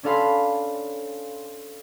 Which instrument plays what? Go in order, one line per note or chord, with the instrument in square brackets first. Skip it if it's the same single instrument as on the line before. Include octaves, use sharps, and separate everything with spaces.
[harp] C#4 D4 A4 F5 B5 C6